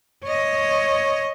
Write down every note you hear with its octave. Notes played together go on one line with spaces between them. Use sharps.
C#5 D#5